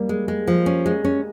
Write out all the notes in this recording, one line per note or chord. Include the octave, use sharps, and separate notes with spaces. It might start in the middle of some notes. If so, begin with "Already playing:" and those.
Already playing: G3 A#3
G#3
G#3
F3
C#4
G#3
C#4